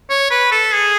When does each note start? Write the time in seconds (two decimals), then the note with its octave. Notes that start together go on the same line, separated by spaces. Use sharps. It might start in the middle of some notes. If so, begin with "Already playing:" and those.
0.10 C#5
0.30 B4
0.52 A4
0.73 G#4